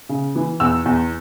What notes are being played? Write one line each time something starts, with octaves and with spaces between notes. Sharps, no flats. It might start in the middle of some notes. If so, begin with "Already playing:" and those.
C#3
E3
E2 E6
E2